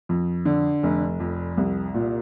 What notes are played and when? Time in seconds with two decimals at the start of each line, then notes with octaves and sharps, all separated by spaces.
0.09 F2
0.45 D3
0.83 F1
1.20 F2
1.57 C2
1.94 A#2